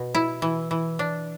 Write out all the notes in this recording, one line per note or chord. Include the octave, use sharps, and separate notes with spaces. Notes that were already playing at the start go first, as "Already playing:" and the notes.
Already playing: B2
E4
E3
E3
D4